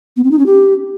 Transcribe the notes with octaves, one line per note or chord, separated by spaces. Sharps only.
B3
C4
D#4
C#4
G4